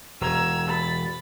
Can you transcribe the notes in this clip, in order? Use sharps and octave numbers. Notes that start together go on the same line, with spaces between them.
E1 A#5 E6 G#6
B5 A6